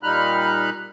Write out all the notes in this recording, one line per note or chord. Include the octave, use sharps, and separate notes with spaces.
A#2 G3 D#4 B5 F6 F#6